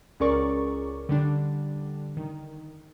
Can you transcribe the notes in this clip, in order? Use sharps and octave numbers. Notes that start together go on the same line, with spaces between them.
C#2 C#4 G#4 A#4 D5 C#6
D3 G3 D4
D#3